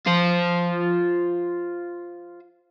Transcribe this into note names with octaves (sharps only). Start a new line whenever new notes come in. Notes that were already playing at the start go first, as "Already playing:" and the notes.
F4 C5